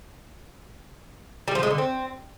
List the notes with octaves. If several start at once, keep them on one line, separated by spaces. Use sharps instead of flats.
G3
F3
G#3
D3
C4